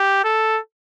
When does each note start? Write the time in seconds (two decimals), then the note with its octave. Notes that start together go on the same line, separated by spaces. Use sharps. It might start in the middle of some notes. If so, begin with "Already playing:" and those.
Already playing: G4
0.24 A4